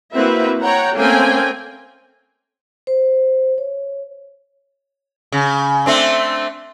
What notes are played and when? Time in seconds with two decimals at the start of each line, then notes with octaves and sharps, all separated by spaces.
0.14 A#3 C4 E4 F#4 B4 E5
0.63 C#5 F#5 G5 A#5
0.96 A3 A#3 C4 C#4 G5 G#5
2.87 C5
3.58 C#5
5.32 C#3
5.86 A3 C4 D4